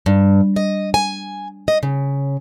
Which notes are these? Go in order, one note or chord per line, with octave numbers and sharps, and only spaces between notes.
G2
D#5
G#5
D#5
C#3